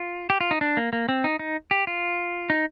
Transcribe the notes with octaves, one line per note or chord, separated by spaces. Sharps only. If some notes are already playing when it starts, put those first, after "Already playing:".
Already playing: F4
G4
F4
D#4
D4
A#3
A#3
C4
D#4
D#4
G4
F4
D#4